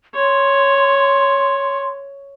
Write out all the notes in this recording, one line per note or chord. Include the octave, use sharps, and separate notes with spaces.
C#5 C6